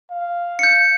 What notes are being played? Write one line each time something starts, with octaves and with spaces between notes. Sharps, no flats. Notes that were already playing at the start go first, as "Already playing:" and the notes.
F5
G6 C#7